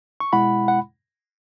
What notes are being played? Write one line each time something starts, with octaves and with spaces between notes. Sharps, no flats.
C#6
B2 G#3 E4 F#5 B5
F#5